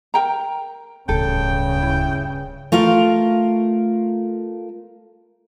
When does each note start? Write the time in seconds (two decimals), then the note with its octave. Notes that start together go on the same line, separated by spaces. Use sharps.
0.14 A#4 G5 A#5
1.09 D1 G2 C#3 A4 G5
1.82 E4
2.72 A3 F4 A#4 F5